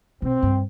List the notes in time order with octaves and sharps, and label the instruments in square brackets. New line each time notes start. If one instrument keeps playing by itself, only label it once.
[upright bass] B2 [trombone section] C4
[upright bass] G2